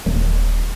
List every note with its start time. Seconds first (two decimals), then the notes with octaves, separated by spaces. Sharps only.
0.06 D#1